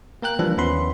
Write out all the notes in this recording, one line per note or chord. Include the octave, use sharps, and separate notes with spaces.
A#3 A#4 G5 F#6
E3 F3 G3 A#3 D4
D#2 B3 C#4 E4 B5 C6